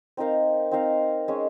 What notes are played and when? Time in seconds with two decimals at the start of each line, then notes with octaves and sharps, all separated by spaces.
0.17 C4 D#4 A#4 F5
0.71 C4 D#4 A#4 F5
1.28 G#3 C#4 G#4